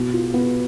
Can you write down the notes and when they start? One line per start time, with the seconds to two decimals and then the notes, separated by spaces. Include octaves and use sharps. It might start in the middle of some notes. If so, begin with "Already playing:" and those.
Already playing: B2
0.13 F4
0.34 B3